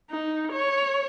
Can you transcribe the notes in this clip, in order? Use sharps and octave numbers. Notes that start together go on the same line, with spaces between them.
D#4
C#5